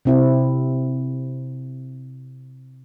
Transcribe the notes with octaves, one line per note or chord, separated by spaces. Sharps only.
C3 C4 E4